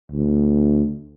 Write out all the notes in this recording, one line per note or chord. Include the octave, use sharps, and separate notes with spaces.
D2